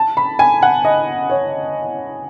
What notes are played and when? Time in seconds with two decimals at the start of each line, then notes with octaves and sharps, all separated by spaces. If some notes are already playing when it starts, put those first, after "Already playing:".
Already playing: A5
0.17 B5
0.39 G#5
0.63 F#5
0.85 D#5
1.30 C#5